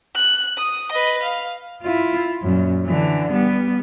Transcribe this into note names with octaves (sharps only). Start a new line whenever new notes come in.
F#6
D#6
B4 D#5
F5
E4 F4
F#2 A#2
D3 E3
G3 B3